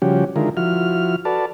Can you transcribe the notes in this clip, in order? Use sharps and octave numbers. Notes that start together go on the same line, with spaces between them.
C#3 F3 G3 C#4 F#4 G4
D3 D#3 G#3 E4 F4 A#4
F3 E4 F#4 F6
F#4 A4 B4 D5 A5